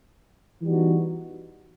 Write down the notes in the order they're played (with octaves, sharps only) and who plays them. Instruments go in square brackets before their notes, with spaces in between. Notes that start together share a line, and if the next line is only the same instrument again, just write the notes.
[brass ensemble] E3 G3 B3 D#4 F#4